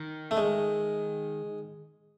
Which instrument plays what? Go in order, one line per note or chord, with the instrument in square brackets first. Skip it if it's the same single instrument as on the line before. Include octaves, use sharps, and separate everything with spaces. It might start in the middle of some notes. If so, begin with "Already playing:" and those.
Already playing: [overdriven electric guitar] D#3
[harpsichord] A3
G#3